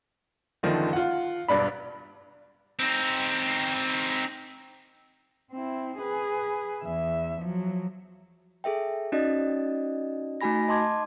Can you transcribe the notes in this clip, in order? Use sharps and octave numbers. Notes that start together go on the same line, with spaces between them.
F#1 D3 D#3 F3
F4 F#5
E1 G2 D4 B5
C4 D#4
C4 E4
G#4 B4
E2 E5
F3 F#3
G#4 A4 E5 G5
C#4 D#4 F#4 D5 D#5
A3 D#4 F#4 G#5 B5 A#6
D#5 A5 C6 D6 G#6